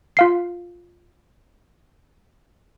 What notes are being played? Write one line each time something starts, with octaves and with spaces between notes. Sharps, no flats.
F4 F5 C7